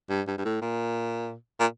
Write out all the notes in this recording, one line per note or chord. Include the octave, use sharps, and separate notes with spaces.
G2
G2
G2
A2
A#2
A#2